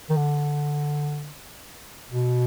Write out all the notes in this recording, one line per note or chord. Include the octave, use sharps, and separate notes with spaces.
D#3
D3
B2